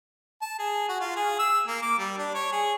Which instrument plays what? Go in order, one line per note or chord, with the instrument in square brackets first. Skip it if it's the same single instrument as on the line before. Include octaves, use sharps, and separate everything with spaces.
[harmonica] A5
G#4
F#4
F4
G#4
E6
A#3
D6
G3
D4
C#5
G#4